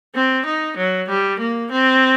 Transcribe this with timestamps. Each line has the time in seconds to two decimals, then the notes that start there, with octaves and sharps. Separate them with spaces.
0.15 C4
0.45 D#4
0.77 F#3
1.09 G3
1.40 A#3
1.71 C4